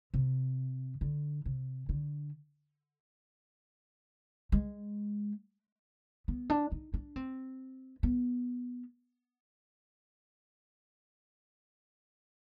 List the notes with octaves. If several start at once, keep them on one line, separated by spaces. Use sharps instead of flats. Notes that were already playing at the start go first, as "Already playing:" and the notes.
C3
D3
C3
D3
G#3
B3
D4
D#4
D4
C4
B3